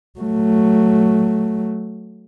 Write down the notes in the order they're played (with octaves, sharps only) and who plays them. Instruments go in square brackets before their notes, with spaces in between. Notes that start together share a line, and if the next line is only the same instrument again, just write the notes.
[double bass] F#3 A3